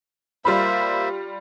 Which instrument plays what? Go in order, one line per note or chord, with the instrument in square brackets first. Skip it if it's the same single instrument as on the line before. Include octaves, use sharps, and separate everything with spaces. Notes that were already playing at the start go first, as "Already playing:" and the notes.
[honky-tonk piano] G3 F4 B5 [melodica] A#3 C5 E5